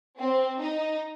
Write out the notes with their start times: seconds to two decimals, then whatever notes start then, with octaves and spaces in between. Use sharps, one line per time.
0.18 C4
0.60 D#4